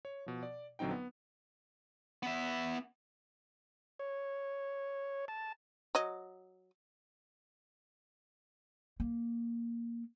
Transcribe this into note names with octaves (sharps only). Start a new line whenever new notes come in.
C#5
B2 F3
D5
A#1 D3 F#3 C4 D#4 G5
B3
B3 E5
C#5
A5
F#3 D#5
A#3